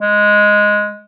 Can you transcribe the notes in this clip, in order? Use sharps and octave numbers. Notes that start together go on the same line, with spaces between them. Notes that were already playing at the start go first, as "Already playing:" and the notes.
G#3